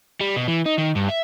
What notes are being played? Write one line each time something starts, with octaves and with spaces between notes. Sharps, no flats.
G3
B2
E3
D#4
D#3
G2
E5